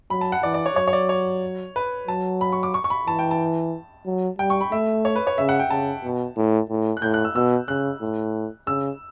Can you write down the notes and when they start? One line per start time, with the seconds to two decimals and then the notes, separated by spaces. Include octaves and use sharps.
0.10 F#3 B5
0.21 A5
0.32 F#5
0.43 E3 D5
0.54 D5
0.66 C#5
0.76 F#3 C#5
0.88 C#5
0.93 D5
1.09 C#5
1.76 B4
2.08 F#3 A5
2.41 B5
2.52 C#6
2.63 D6
2.74 C#6
2.84 C#6
2.90 B5
3.07 E3 A5
3.19 G5
3.31 A5
4.06 F#3
4.39 G3 G5
4.50 C#6
4.61 B5
4.72 A3 E5
5.05 C#5
5.16 B4
5.27 C#5
5.38 C#3 E5
5.49 F#5
5.59 G5
5.70 C#3 A5
6.04 B2
6.37 A2
6.70 A2
6.97 F#6
7.02 A2 G6
7.14 F#6
7.25 E6
7.35 B2 E6
7.68 C#3 F#6
8.02 A2
8.67 C#3 E6